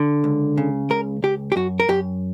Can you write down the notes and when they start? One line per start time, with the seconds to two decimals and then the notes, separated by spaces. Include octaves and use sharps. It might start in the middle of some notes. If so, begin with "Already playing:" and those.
Already playing: D3
0.24 C#2
0.57 C#3
0.90 C#2 A#4
1.23 C#2 G4
1.52 G4
1.56 F#2 F#4
1.80 A#4
1.88 F#2 G4